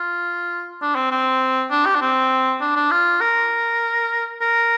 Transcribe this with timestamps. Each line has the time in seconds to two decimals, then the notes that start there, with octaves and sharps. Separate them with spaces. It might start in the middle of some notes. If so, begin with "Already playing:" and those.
Already playing: F4
0.82 D4
0.96 C4
1.11 C4
1.71 D4
1.86 G4
1.95 D4
2.01 C4
2.61 D4
2.76 D4
2.91 F4
3.21 A#4
4.41 A#4